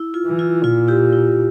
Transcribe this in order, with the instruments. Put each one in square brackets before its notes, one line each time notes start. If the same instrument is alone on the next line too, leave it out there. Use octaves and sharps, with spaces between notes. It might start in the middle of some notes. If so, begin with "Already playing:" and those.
Already playing: [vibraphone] E4
F4
[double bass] E3
[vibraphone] F4
[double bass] A#2 [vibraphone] F4
[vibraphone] E4 G4
E4